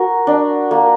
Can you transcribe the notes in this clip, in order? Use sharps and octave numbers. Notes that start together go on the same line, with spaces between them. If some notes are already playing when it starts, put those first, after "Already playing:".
Already playing: F#4 A#4
D4
A#3